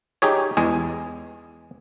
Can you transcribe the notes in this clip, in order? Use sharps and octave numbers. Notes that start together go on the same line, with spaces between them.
D#4 G4 G#4 C#5
E2 G#3 G#4